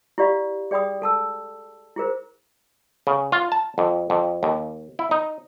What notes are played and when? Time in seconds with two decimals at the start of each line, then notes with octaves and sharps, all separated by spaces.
0.18 E4 G4 D5 F5 B5
0.71 G#4 D5 G5 B5 D#6
1.02 A4 A5 E6
1.96 E4 G#4 A#4 C5
3.07 C#3
3.32 F4
3.52 A5
3.78 F2
4.10 F2
4.43 D#2
4.99 E4
5.11 D#4